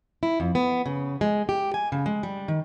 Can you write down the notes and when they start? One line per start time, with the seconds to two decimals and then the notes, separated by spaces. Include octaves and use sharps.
0.23 E4
0.40 F2
0.55 B3
0.86 C#3
1.21 G#3
1.49 G4
1.74 G#5
1.92 C#3
2.06 G#3
2.23 G3
2.48 D#3